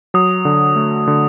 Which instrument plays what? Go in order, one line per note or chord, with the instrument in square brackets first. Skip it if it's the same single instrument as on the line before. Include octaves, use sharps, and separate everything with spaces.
[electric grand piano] F#3 [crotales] D#6
[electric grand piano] D3
A3
D3